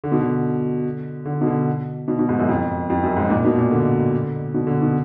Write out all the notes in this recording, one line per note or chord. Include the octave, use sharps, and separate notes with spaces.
D3
B2
D3
D3
B2
D3
B2
B2
G#2
F#2
F2
F2
F#2
G#2
A#2
B2
A#2
D3
B2
D3
B2